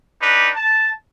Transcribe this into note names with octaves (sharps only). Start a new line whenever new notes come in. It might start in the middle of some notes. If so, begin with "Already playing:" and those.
D4 D#4 G4 B4
A5